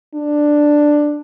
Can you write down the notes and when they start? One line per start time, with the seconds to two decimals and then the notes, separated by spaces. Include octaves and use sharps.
0.15 D4